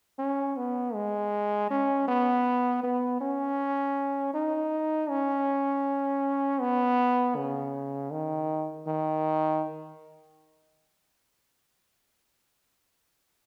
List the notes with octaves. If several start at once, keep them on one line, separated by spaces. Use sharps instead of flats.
C#4
B3
G#3
C#4
B3
B3
C#4
D#4
C#4
B3
C#3
D#3
D#3